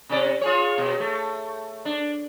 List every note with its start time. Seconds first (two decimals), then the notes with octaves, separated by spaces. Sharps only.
0.09 C3 C#4 D5
0.41 F4 G#4 C#5
0.78 B2
1.00 A3
1.85 D4